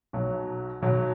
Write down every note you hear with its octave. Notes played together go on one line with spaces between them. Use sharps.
B1 B2 F#3
B1 B2 F#3